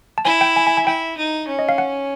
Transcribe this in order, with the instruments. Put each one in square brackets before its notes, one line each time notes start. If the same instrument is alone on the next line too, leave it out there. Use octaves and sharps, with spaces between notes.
[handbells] A5
[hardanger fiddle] E4 [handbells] G#5
[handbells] G5
G#5
G#5
G#5
[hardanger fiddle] E4 [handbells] G5
[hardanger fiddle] D#4
C#4
[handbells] D#5
F5
F#5